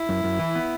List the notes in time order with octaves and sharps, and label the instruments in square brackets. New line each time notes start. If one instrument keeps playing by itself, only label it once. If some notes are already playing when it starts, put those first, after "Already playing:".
Already playing: [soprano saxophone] E4
[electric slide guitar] F#2
F#2
E3
B3